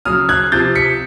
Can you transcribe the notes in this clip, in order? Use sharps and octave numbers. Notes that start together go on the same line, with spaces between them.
C#3 F#3 D#6 F6
F#6 G#6
C3 F3 G6 A6
B6 C#7